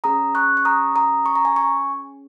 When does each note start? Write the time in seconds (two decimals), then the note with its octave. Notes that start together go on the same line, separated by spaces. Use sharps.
0.04 C#4 G#4 A#5 D#6
0.35 C#6 F#6
0.57 C#6
0.65 A#5 D#6
0.96 A#5 D#6
1.26 C#6
1.35 A#5
1.45 G#5 C#6
1.56 G#5 C#6